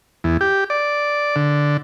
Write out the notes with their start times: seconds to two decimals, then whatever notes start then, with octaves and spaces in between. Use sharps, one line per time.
0.24 E2
0.41 G4
0.70 D5
1.36 D3